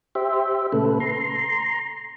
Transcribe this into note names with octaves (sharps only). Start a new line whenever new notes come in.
G4 C5 E5
A#2 C#3 A3 A4 B4
A#5 C6